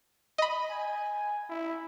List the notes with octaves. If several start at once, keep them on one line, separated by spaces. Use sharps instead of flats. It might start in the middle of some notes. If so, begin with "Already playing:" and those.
D#5 B5
G#5
E4